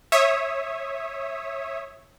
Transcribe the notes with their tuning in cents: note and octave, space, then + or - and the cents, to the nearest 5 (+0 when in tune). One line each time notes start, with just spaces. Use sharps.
C#5 -15 E5 +0 D#6 +0